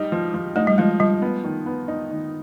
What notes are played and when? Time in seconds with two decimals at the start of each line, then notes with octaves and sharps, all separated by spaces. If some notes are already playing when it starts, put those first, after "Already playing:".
Already playing: G3 D#4
0.12 F3
0.34 F3
0.56 A3 D#4
0.67 G3
0.78 F3 G#3
1.00 F3 G3
1.22 B3
1.44 D#3
1.66 B3
1.88 D#4
2.11 D#3